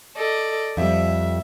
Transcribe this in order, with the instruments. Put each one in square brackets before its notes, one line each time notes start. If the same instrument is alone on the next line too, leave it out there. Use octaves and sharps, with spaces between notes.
[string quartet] A4 D5 D#5
[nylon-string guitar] F2 G3 [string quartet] E5